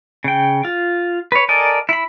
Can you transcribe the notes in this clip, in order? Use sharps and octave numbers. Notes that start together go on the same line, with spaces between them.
C#3 G5
F4
B4 C#5
A4 A#4 D5 D#5 G#5
E4 B5